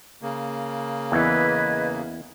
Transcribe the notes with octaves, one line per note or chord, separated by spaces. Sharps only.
C#3 A#3
E2 E3 B4 D#5 G#6